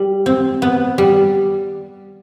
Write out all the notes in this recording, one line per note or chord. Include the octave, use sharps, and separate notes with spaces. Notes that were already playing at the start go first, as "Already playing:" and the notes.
Already playing: G3
C4
B3
G3